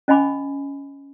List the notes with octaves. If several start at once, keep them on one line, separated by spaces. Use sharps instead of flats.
C#4 D#5 G#5 B5 D6